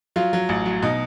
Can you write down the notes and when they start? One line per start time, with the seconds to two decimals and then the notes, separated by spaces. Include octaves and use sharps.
0.16 F#3 F4
0.33 F#3
0.49 A1
0.66 F#3
0.82 B2 D#4